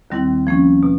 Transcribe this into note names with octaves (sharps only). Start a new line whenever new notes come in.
D#2 D#3 G3 C4 E4
F3 A#3 C#4
B2